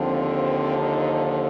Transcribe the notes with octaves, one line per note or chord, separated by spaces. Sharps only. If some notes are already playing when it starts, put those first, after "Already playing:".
Already playing: D#2 D3 F3 C4
D#4